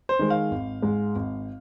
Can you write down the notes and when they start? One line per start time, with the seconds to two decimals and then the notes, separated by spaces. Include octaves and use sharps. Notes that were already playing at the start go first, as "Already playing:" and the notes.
0.09 C5
0.19 D#3 G#3
0.30 F5
0.51 G#1
0.82 G#2 G#3
1.16 G#1